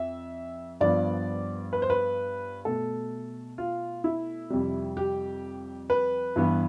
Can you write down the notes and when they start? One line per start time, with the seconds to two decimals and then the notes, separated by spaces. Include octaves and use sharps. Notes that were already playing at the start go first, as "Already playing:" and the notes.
Already playing: F2 E5
0.81 G2 F3 B3 D5
1.73 B4
1.82 C5
1.90 B4
2.65 B2 A3 A4
3.58 F4
4.04 E4
4.50 F2 C3 G3
4.97 G4
5.90 B4
6.36 G2 E3 B3